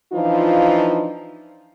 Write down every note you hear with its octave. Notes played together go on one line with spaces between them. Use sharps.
E3 F3 D4 D#4 F4